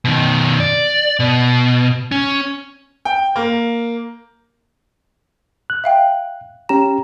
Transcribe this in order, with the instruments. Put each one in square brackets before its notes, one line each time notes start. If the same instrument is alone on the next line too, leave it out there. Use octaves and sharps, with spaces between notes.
[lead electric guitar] B2 D#3
D5
B2
C#4
[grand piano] G5
A#3
[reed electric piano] F#6
[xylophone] E5 F5 G5
[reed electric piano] C#4 G4 A#5 [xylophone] E7